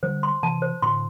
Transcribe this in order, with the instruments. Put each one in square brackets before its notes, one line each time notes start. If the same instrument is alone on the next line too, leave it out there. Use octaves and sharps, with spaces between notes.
[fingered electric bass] D3 G3 [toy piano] C5
[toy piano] C6
[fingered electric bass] C3 E3 [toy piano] A5
[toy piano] C5
[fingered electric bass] A2 D3 [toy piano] C6